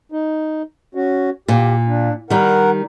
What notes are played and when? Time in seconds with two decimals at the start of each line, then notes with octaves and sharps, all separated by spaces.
0.12 D#4
0.95 C#4 F#4
1.48 A#2 G4
1.88 D4
2.30 D#3 G3 A#4 F#5